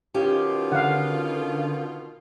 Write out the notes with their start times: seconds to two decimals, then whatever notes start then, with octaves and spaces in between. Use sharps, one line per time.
0.14 B2 D#3 C#4 D#4 F4 G4
0.72 D3 F5 F#5